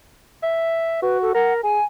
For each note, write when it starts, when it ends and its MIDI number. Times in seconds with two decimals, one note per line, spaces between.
0.43 1.02 76
1.02 1.30 66
1.02 1.18 71
1.22 1.34 69
1.34 1.62 70
1.34 1.54 78
1.63 1.79 68
1.63 1.84 80